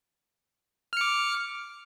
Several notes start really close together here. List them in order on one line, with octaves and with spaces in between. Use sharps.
F6 C#7 D6